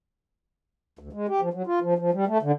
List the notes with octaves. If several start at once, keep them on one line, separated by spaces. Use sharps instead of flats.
D2
G#3
G4
F3
F#3
F4
F3
F3
G3
A3
D3